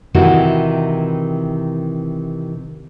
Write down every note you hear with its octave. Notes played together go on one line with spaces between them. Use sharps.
C3 D#3 E3 E4 F#4